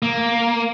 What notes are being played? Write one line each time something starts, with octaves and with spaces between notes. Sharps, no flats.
A#3